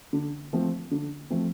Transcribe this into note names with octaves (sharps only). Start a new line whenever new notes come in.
D3
F3 A3 C4
D3
F3 A3 C4